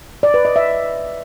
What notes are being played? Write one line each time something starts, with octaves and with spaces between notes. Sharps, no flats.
D5
B4
D#5
E5